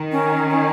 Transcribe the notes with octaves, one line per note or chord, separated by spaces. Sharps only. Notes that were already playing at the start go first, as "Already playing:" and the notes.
Already playing: D#3
C#4
C#4